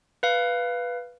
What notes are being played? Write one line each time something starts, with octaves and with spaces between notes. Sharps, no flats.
B4 F5